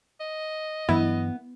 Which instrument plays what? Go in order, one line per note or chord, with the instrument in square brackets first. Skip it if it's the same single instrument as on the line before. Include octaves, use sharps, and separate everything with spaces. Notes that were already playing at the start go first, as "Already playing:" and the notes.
[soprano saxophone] D#5
[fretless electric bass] G2 E3 F#3 [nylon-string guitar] B3 [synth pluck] E4